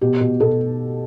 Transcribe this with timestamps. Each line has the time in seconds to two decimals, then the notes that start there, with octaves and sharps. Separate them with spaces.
0.01 B2 G4
0.21 B2
0.40 B2 A4